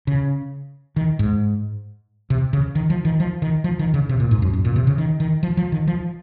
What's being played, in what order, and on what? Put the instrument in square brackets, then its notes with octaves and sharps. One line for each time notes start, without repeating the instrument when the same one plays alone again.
[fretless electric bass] C#3
D#3
G#2
C3
C#3
D#3
F3
D#3
F3
D#3
F3
D#3
C#3
C3
A#2
G#2
F#2
F#2
A#2
C3
C#3
D#3
D#3
F3
F3
D#3
F3